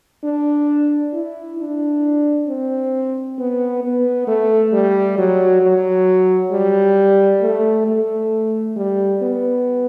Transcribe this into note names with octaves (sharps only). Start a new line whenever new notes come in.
D4
E4
D4
C4
B3
B3
A3
G3
F#3
F#3
G3
A3
A3
G3
B3